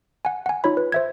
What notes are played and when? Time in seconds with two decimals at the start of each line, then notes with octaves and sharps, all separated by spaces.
0.25 F#5 G#5
0.46 F#5 G#5
0.64 D#4 F4 C#5 B5
0.77 B4
0.92 C5 E5 G#6